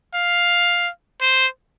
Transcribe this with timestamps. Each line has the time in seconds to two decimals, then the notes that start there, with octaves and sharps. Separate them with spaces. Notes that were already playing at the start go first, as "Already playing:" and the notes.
0.14 F5
1.21 C5